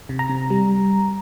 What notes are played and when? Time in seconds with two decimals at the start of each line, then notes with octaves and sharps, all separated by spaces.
0.09 C3
0.19 A#5
0.30 C3
0.50 G3